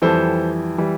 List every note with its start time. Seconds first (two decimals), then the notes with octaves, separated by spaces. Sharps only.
0.02 F2 E3 G3 A4 C5
0.78 E3 G3